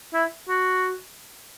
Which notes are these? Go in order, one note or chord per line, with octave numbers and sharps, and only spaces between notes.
E4
F#4